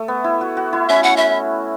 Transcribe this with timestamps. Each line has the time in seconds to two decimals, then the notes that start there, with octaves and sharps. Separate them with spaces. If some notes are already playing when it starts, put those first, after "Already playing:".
Already playing: A3
0.08 B3
0.24 E4
0.41 F#4
0.57 F#4
0.73 E4
0.89 C#4 E5
1.03 F#5
1.17 E5